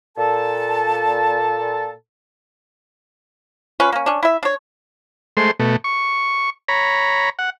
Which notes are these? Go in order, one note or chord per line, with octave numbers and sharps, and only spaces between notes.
A#2 A4 A5
C#4 F4 B4
A#3 C#4
C#4 D4
E4 E5
D4 C#5
G#3 A3 C5 C6
B2 A3
C#6
C#5 A#5 B5
F#5